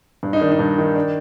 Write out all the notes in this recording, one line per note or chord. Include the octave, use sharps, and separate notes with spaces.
G2
D#4
D#3 D4
D#4
G2
D#3
D4